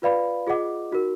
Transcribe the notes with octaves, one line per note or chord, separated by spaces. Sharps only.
F4 B4 D5 F5 B5
F4 G#4 D#5 F#5 D6
D#4 F#4 A#4